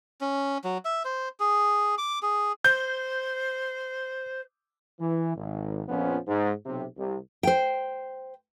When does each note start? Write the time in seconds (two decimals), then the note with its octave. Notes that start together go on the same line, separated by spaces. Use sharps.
0.21 C#4
0.64 F#3
0.85 E5
1.05 C5
1.40 G#4
1.98 D6
2.22 G#4
2.65 C5 G6
5.00 E3
5.35 G#1
5.87 A#1 F2 F3 B3 C#4
6.28 G#2
6.66 B1 C3
6.97 C2 C3
7.43 C5 G5